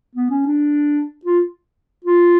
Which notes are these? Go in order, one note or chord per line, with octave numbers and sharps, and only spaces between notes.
B3
C#4
D4
F4
F4